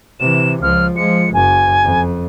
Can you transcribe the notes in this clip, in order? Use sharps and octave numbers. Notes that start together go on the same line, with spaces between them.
C3 E3 E7
C#2 F3 F6
F3 G#3 C#7
F#1 F#2 G#5
F2